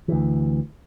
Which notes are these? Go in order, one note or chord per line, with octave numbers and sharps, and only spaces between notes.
D2 E3